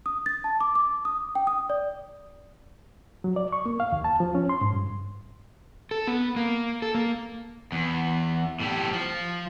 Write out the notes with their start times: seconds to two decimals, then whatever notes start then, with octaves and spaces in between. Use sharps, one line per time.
0.06 D#6
0.26 A6
0.44 A5
0.61 D6
0.75 D6
1.05 D#6
1.35 G5
1.47 D#6
1.70 D5
3.24 F#3
3.36 D5
3.52 C#6
3.66 A#3
3.80 F5
3.92 D#2
4.04 A5
4.20 F3
4.35 C#4
4.49 C6
4.61 G#2
4.73 G2
5.91 A4
6.07 B3
6.36 A#3
6.82 A4
6.95 A#3
7.72 E2
8.60 A2 G3
8.93 F3